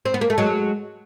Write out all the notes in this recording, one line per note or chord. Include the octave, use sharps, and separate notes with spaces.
C4
B3
A#3
A3
F#3 G#3